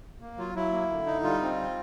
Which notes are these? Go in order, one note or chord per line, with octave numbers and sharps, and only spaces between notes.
A#3
F#3 F4
F#3 E4
A#3
D3
D#4
G3 F4
C4